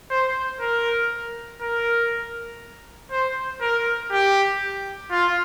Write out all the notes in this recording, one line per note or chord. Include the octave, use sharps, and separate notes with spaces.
C5
A#4
A#4
C5
A#4
G4
F4